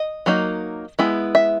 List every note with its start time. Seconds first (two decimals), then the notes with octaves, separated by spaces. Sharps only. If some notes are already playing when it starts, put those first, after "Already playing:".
Already playing: D#5
0.26 F#3 A#3 D#4
0.99 G#3 B3 E4
1.35 E5